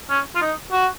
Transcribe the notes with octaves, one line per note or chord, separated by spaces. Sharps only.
C#4
F4
D#4
F#4